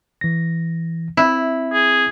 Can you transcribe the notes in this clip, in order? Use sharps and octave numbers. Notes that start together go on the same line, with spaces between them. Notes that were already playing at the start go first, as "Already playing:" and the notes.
E3 A#6
C4 E4
G#4